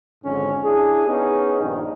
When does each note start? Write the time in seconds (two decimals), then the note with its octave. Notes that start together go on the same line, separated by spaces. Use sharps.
0.24 G#1 F2 G#2 D3 C#4
0.64 D4 E4 G#4
1.07 B3 C#4 D#4 G#4
1.61 A#1 G2 D#3